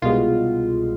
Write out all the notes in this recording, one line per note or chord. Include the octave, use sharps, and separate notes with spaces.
C2 B2 G#3 F4